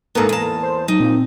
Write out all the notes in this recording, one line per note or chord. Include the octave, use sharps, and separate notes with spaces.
G#2 A#3 B3 A4 A#4 A#5
E2 A5
C5
F#3 D#4
A#2 C4